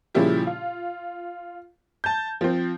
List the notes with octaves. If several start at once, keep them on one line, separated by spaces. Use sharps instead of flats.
A#2 C#3 F3 G3 E4 G4
F4
A5 G6
F3 C4